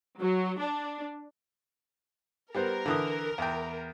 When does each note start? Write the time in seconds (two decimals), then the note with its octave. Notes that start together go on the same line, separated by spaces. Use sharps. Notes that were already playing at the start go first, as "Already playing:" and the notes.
0.20 F#3
0.60 D4
2.55 G3 B3 A#4 C5
2.86 D3 E3 D#6
3.38 E2 G5